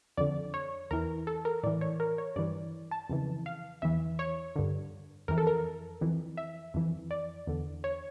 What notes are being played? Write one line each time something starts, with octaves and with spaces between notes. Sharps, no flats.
F2 D3 D5
C#5
E2 E3 A#4
A4
A#4
A2 E3 D5
C#5
A#4
C#5
G2 E3 D5
A5
F2 C#3 E3
F5
E2 E3 E5
C#5
G2 D3
F2 E3 A#4
A4
A#4
F2 E3
E5
F2 E3
D5
E2 D3
C#5